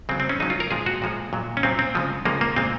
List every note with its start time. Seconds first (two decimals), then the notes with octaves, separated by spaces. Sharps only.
0.09 C#3 F#3 C4
0.20 C4
0.29 C#4
0.40 C#3 F#3 D#4
0.50 F4
0.60 A#4
0.71 A#2 F3 G#3 G#4
0.86 F#4
1.02 A#2 F3 G#3
1.33 A#2 F#3
1.57 C#4
1.63 A#2 F#3 C4
1.79 C4
1.95 C#3 F3 G#3
2.25 C#3 F3 G#3 A#3
2.41 A#3
2.56 A#2 G#3 C4